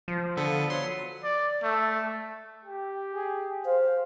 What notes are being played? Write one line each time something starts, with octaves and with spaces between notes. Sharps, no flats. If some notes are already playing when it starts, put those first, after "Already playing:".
F3
D3 B3 A4
F#3 C6
D5
A3
G4
G#4
C5 F5